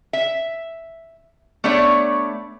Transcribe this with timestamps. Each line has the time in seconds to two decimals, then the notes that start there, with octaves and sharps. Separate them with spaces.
0.13 E5
1.64 A3 B3 D4 C#5 D5